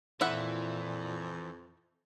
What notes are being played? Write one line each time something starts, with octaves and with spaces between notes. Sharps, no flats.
F2 A#2 E3 E4 E5 F#5